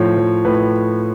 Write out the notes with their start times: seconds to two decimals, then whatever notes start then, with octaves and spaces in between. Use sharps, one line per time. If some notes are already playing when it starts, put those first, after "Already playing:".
Already playing: A2 F3 C#5
0.17 F3
0.45 A2 B4